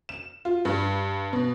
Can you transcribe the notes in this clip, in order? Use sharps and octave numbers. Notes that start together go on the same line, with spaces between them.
E7
F4
G2
B2